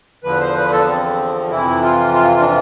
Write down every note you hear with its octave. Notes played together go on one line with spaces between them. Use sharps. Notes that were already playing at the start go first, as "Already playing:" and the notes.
E2 D3 F3 B4
C5
B4
A4
C4
F2 C3 E3 E4
F4
F4
D4